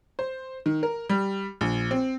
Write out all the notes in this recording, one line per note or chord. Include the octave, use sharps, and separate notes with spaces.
C5
D#3
A#4
G3
A#1
C4